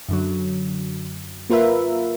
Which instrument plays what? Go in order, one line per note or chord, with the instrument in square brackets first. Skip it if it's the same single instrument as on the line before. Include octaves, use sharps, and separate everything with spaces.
[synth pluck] F#2 D3 F#3
A#3 F4 A#4 B4 E5